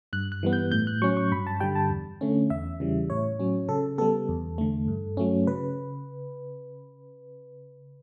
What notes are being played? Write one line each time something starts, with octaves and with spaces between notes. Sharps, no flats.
G2 F#6
F#6
E3 G3 B3
G6
A2 G6
F#6
F#3 C#4 C#6
C#6
G2 B5
A5
D3 G3 G5
A5
E2
D3 A3 C#4
E2 E5
C#3 E3 G3
A2 C#5
F#3 C#4
C#3 A4
G3 B3 A4
E2
D3 A3
G2
F#3 A3 C#4
C#3 B4